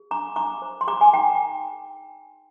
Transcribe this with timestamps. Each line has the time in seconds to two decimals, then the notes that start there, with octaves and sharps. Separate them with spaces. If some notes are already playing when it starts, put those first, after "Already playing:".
Already playing: G#4
0.11 D4 A#5 D6
0.36 D4 A#5 D6
0.62 C5
0.81 C6
0.87 G#4 A#5 D6
1.01 G#5 C6
1.13 D#4 G5 A#5